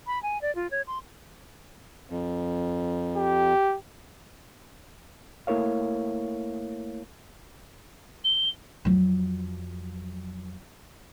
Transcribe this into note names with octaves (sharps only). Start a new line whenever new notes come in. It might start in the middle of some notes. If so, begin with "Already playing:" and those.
B5
G#5
D5
F4
C#5
C6
F2
G4
A3 A#3 E4 A#4 C#5 F5
G7
F2 F#3